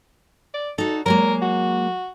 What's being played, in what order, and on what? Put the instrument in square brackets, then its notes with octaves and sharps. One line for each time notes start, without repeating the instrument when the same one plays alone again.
[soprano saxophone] D5
[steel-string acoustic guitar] D#4 F#4 [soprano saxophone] A4
[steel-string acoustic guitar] F#3 G#3 A#3 [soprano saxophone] A#4
[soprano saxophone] F#4